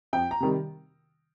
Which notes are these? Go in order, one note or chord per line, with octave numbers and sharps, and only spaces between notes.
F2 G5
A#5
C3 D#3 G3